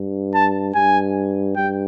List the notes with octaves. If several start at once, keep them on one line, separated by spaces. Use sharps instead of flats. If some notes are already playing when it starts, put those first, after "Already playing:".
Already playing: G2
A5
G2 G#5
G2 G5